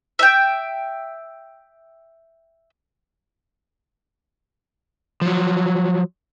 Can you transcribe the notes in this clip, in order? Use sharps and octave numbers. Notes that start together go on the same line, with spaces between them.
E5 G5
F3 F#3